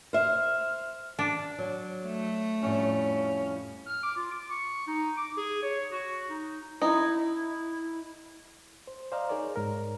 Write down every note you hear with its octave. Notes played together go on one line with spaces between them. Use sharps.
C5 E5 F6
D4
F#3
A3
F2 A2 G3 C#4
F6
D6
F4
D6
C#6
D#4
D6
G#4
C#5
F#4
D#4
D#4 E4
C5
C5 D5 D#5 F5 A#5
D#4 G#4 A#4 C#5 D5
G#2 A#4